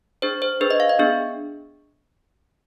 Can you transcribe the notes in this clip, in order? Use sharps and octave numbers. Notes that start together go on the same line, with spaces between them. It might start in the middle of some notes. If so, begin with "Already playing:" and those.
D4 G#4 C5
C5
D4 G#4 B4
D#5
F5
D#5
B3 D4 G#4